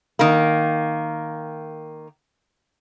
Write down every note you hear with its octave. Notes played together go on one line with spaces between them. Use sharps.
D#3 A#3